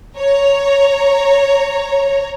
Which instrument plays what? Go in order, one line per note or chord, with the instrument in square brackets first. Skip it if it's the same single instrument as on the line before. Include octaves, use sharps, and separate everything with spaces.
[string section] C#5 A#5